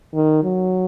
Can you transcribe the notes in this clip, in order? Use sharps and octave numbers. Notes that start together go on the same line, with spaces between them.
D#3
F#3